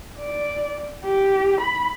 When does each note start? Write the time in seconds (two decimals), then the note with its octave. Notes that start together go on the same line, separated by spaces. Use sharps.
0.20 D5
1.04 G4
1.61 B5